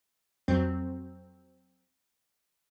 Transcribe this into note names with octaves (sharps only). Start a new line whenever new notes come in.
F2 F#3 C4